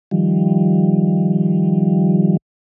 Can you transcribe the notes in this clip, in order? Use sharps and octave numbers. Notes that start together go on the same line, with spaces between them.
D#3 F3 G3